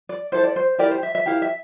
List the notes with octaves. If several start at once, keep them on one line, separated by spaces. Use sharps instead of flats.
D5
E4 A4 C5
D5
C5
E4 G4 A#4 D5
C5
E5
E5
E4 G4 A#4 F5
E5